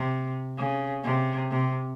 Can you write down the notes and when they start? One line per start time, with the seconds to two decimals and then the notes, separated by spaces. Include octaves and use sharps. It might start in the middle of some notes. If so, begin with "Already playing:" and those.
Already playing: C3
0.57 C#3
1.04 C3
1.51 C3